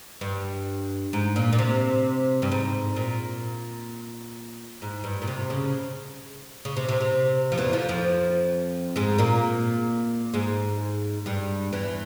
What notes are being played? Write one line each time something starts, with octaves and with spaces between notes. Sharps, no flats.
G2
G#2
A#2
A#2
C3
G2
G#2
A#2
G#2
G2
A#2
C3
C#3
C#3
C3
C3
C3
F3
E2 E3
F2 F3
F2 F3
G#2 G#3
A#2 A#3
G#2 G#3
G2 G3
E2 E3